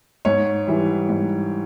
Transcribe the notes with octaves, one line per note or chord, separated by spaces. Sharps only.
G#2 C#5
E3 G3
G#2